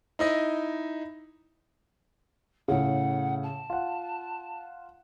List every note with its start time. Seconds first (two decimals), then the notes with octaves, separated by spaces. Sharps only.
0.19 D#4 E4 D#5
2.68 A2 C#3 F#5
3.43 A5
3.70 F4 F#5